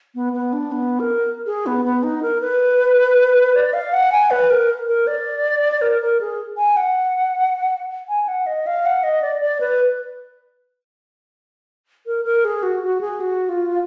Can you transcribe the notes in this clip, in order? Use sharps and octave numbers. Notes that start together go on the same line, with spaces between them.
B3
B3
D4
B3
A#4
G#4
B3
B3
D#4
A#4
B4
D5
F5
F#5
G#5
B4
A#4
A#4
D5
A#4
A#4
G#4
G#5
F#5
G#5
F#5
D#5
F5
F#5
D#5
D5
D5
B4
A#4
A#4
G#4
F#4
F#4
G#4
F#4
F4